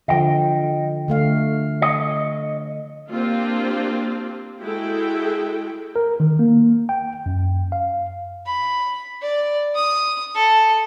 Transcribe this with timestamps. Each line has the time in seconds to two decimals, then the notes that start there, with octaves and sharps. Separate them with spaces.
0.08 D3 F3 D#5 G5
1.08 D3 A3 F5
1.82 C#5 D#5
3.10 A#3 C4 D4 F4 G4
4.62 G#3 E4 F#4 G#4 A4 G5
5.96 A#4
6.20 D#3
6.39 A#3
6.89 G5
7.26 F#2
7.72 F5
8.46 B5
9.22 D5
9.75 D#6
10.35 A4